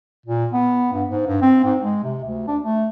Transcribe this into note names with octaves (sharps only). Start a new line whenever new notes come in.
A#2
B3
G2
G#2
G2
C4
G#2
G#3
C3
D2
D4
A3